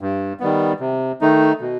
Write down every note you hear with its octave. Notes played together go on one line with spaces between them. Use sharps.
G2
D#3 G3 B3
C3
D#3 A3 D#4
B2